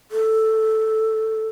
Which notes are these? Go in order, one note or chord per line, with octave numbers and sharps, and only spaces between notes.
A4